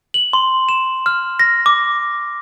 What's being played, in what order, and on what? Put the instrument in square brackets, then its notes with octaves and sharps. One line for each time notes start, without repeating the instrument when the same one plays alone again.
[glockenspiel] F#7
C6
E7
F6
A#6
D6